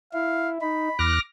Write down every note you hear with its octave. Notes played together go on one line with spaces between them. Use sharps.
E4 F5
D#4 B5
E2 D6 F6 F#6 A#6